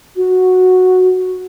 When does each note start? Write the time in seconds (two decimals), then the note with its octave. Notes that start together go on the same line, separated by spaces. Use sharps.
0.16 F#4